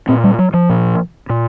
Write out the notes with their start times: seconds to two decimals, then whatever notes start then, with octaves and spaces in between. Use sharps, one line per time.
0.08 A#2 C4
0.24 G3
0.39 F#3
0.54 F3
0.69 A#2
1.30 A#2